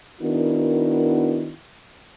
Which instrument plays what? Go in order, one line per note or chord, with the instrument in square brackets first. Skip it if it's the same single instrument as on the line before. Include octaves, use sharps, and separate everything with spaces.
[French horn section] D#3 B3 D4 E4 F#4 A#4